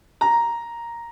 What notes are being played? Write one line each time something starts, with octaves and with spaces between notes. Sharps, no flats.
A#5